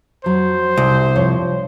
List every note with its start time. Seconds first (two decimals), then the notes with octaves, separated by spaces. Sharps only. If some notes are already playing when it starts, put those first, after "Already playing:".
0.24 F2 F#3 C5
0.77 C2 C3
1.15 G2 F3 C#5